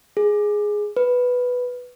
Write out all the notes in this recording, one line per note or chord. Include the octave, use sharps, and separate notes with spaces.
G#4
B4